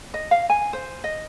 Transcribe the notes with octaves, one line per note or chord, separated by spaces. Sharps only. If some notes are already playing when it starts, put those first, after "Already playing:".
D#5
F5
G#5
C5
D#5